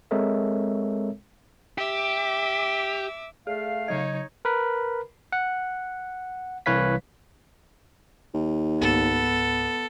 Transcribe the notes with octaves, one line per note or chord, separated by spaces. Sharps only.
G#3 C4 A4 A#4 C#5 E5
G4 E5 D6
A3 G#4 F5
C#3 F#3 D#4 C#5 D#5 G#6
A#4 B4 B5
F#5
C2 E3 B4 C#5 F5 B6
D#2
C#2 G#2 B3 A4